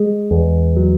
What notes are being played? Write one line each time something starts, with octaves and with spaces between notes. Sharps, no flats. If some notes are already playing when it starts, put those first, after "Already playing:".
Already playing: G#3
E2
F#3